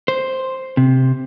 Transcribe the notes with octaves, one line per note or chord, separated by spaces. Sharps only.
C5
C3